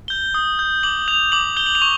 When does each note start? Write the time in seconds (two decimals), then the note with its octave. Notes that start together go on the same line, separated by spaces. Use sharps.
0.08 G6 G7
0.34 D#6
0.59 G6
0.83 D6 F#7
1.08 G6 F7
1.32 D6 F#7
1.56 G6 G7
1.66 F#7
1.75 F7
1.82 C#6